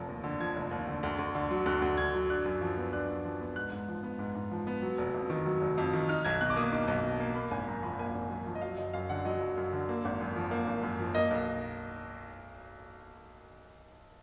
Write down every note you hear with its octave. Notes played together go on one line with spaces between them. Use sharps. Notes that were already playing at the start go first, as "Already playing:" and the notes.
Already playing: F1 F3
D#2
D3
F3 G#6
F1
D#2
D3
D2
D2
D3
F#3
D2 F#6
D2
D3 G#6
F#3
D4 F#6
F#2
F3
B3
D4 F#6
F#2
F3
B3
G#2 F#6
G#2
F3
B3
G#2
G#2
F3
B3
F#3
F1
F2
D#3
F#3
F1
F2
D#3
D#4 F6
B1 G#6
B2 F#6
D6
A#3 D#6
D#4 D6
B1
B2
A#3
A#3 B5
G#1 G#5
F#2 A#5
F3 B5
A#3 G#5
G#1
F#2
F3
D#5
F#3 F5
F#1 D#5
F#2 F5
D3 F#5
F#3 D#5
F#1
F#2
D3
A#3
G#1
F#2
F3
A#3
G#1
F#2
F3
A#3 D#5
B1